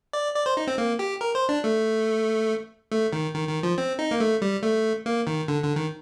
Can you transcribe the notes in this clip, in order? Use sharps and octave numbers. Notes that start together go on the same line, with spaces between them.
D5
D5
C5
D#4
C4
A#3
G4
A#4
C5
D4
A3
A3
D#3
D#3
D#3
F3
C4
D#4
A#3
A3
G3
A3
A#3
D#3
D3
D3
D#3